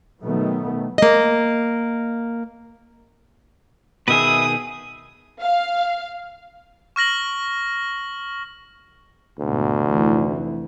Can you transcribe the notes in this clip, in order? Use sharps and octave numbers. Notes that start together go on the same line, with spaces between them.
B2 D#3 F#3 A3 B3
A#3 D#5
B2 D#3 G#4 B4 E5 D#6
F5
C#6 F6 A#6 F#7
G#1 D2 B2
F1 E3